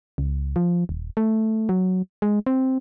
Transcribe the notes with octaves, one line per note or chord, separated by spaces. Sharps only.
C#2
F3
D#1
A3
F#3
G#3
C4